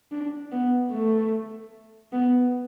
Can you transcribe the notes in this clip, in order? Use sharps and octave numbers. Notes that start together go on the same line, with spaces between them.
D4
B3
A3
B3